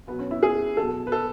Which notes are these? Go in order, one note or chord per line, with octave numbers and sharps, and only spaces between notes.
B2 F#3 B3
C#4
E4
G#4
B2 F#3 A4
B4
A4